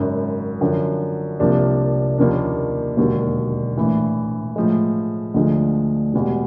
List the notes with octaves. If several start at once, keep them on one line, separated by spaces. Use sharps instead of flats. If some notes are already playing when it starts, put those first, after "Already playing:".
Already playing: G#1 F#2 C#3
F#2 D3 F3
C2 C3 F3 A#3 D4
D#2 C#3 F3 A#3 D4
E1 D#2 D3 F#3
A#1 A2 E3
A2 F3 G#3
D2 D3 F3 G#3
E1 E2 B2 G3